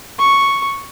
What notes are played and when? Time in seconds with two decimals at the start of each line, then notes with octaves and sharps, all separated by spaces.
0.19 C#6